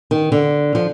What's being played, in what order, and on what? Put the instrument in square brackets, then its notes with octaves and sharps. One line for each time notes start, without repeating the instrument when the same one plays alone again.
[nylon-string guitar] D#3
D3
F3